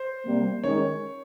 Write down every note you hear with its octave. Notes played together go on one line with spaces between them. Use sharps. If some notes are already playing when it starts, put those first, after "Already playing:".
Already playing: C5
C3 G3 A#3
D#3 G#3 C#4 C#5